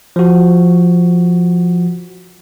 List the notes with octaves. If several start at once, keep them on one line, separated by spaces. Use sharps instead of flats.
F3 F#4